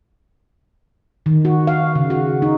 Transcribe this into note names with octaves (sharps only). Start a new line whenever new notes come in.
D#3
F#4
F5
C#3
F#4
D#4